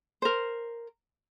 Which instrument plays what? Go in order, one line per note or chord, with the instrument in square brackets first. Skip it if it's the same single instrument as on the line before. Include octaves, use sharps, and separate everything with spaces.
[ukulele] A#4 C5